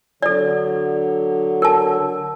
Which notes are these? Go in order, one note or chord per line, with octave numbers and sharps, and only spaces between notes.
D3 F#3 A4 D5
A#4 A5